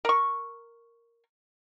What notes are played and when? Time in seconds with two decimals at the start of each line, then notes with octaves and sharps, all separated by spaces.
0.05 A#4 C#6